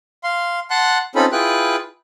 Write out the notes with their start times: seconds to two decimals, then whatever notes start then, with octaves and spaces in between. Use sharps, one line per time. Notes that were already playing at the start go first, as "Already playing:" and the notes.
0.24 F5 C6
0.70 F#5 A5 C6 F#6
1.15 C4 C#4 D#4 F4 A4 B5
1.32 E4 F4 G#4 B4 G5 F#6